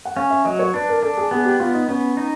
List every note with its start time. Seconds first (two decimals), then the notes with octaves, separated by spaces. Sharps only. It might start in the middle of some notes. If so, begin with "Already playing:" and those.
0.05 F#5
0.17 C#4 F5
0.30 E5
0.45 F#3 D#5
0.59 C#5
0.74 D4 B4
0.89 A#4
1.02 D4 A4
1.17 G#4
1.31 B3 G#4
1.45 G4
1.60 B3 F4
1.74 D#4
1.88 B3 C#4
2.17 D#4